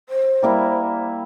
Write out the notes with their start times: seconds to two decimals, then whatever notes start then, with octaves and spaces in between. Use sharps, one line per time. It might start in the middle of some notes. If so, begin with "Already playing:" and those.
0.09 C5
0.43 G3 A#3 E4